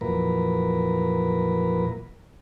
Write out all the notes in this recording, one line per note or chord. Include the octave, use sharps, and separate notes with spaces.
F2 A#2 E3 F#3 A#4 B4